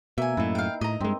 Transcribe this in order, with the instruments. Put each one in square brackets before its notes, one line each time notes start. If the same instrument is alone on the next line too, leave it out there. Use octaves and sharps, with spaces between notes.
[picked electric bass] B2 [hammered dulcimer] A#3 [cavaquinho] E5 G#5
[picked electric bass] F#2 A2 [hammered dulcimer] D#4 E4 B4
[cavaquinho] F5 G5
[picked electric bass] A2 [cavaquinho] D#5 A#5
[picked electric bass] G2 G#3 [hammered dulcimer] C4 A#4